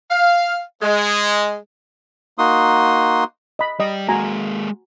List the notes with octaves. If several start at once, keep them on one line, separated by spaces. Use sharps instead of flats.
F5
G#3
A#3 D#4 F#4 C6 D#6
D#5 B5
G3 G4 D#5
G#3 A#3 F#4 G#5 A#5